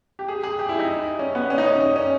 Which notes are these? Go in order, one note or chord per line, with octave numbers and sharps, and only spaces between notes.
G4
G#4
G#4
G4
E4
D#4
C#4
B3
C#4
D#4
C#4
C#4
C#4